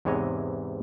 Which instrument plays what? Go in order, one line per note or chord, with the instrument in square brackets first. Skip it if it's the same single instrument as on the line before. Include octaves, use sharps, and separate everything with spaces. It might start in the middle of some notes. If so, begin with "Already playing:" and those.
[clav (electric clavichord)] E2 G#2 C3 E3 C#5 D#5